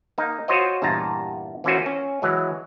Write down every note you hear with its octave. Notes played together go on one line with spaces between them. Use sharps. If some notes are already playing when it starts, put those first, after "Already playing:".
A#3 D#4
F4 F#4 C5 C#5 D#5
E2 G2 A#2 F4 A5 A#5
E3 A#3 C#4 F4 F#4 C5
C#4
E3 F#3 G#3